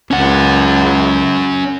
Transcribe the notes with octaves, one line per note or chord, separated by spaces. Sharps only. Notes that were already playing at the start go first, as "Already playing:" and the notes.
C#2 C#4 F#5